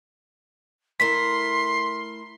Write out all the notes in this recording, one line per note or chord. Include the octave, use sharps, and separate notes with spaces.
A3 E4 A#4 C6 B6